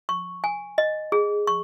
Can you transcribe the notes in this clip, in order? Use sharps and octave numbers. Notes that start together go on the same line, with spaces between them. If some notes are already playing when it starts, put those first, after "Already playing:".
C#6
G#5
D#5
G#4
C#6